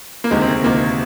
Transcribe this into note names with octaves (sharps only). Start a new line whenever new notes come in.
A#3
D2 C3 D#3 G#3
C4
A#3
D2 C3 D#3 A#3